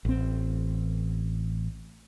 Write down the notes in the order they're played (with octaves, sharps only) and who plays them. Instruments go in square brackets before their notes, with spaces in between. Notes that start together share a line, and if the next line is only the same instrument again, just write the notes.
[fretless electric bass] A1 C4